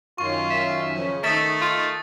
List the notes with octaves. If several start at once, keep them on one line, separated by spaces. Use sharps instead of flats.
F#2 D#3 C#4 F4 C#6
E5
C#3 F3 C#4
D#3 A3 D#4 E5 D#6 A6
F4